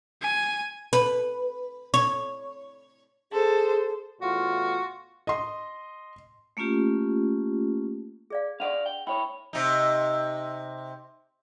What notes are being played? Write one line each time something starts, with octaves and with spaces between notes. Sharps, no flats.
G#5
B4
C#5
G#4 A4 C5
E2 A2 F4 F#4
D#5 C6
A3 A#3 C#4 F4 G4
G#4 D5 F5
D4 D5 D#5 F5 F#5 C#6
G5
E4 C#5 G5 B5
C3 D#4